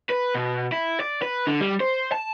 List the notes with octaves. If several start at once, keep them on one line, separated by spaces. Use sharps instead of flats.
B4
B2
E4
D5
B4
D3
G3
C5
A5